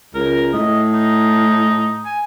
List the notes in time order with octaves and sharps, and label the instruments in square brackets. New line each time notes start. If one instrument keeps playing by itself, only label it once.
[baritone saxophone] C#2 [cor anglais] A#4
[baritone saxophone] A2 [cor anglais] D#5
[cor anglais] D#4
G#5